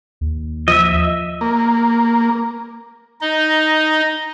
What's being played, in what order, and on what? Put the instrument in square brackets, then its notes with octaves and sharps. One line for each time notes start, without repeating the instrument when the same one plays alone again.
[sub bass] D#2
[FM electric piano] F3 [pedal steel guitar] D#5 E5
[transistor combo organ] A#3
[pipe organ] D#4 D#5